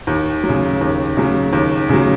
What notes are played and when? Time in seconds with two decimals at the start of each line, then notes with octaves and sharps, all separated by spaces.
0.07 D#2
0.44 F#3
0.49 C#3
0.81 D#2
1.17 C#3 F#3
1.53 D#2
1.89 C#3 F#3